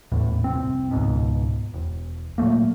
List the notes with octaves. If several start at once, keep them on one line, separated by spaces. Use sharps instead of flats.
D#1 E2 A2
F1 C2 C4
C#2 G#2 B2
E1
A#2 F#3 A3 A#3